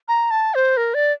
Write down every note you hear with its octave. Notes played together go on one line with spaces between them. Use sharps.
A#5
A5
C5
A#4
D5